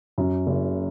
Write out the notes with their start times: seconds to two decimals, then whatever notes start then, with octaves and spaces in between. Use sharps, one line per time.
0.18 F#2
0.47 F#1